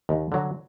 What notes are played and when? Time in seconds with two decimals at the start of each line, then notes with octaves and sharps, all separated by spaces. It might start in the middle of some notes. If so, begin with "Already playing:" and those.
0.09 D#2
0.32 D3 F#3